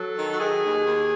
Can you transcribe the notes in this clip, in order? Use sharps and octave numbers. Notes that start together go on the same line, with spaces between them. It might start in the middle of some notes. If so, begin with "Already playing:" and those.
Already playing: F#3 A4
D#3
F#4
D#3 G#4
D#2
D#2